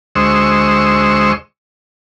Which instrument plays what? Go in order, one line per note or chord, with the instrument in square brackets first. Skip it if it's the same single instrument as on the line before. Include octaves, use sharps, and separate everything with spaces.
[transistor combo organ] D2 G#3 C5 D#5 C#6 E6